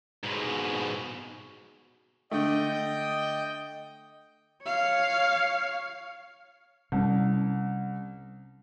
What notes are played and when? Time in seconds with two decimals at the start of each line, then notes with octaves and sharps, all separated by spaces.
0.24 G#2 B2
2.31 D3 A3 D#5 G5
4.64 C#5 F5
6.92 C2 C3 G3 C#4